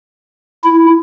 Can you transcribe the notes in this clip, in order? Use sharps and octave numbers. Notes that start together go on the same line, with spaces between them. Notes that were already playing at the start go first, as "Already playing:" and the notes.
E4